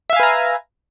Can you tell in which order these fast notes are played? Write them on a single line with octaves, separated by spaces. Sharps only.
E5 F5 G#5 B4 A#5